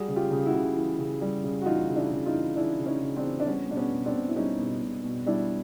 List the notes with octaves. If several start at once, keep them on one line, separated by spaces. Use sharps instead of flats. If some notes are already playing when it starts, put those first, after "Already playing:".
Already playing: G3 F#4 G#4
C#3
F4 G4
C#3
E4 F#4
C#3
E3
C#3
G3
C#3
F#4
E3 D#4 F4
C#3
D4 E4
C#3
D#4 F4
E3
E3 D4 E4
C#3
C#4 D#4
C#3
C4 D4
E3
D4
G3 B3 C#4
B2 D4
B3 C#4
B2
C4 D4
B2
E4
G3 C#4 D#4
B2
B2
B2
G3 D4 E4